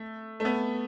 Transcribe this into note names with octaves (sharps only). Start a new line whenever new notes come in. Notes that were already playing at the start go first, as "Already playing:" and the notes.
Already playing: A3
A3
B3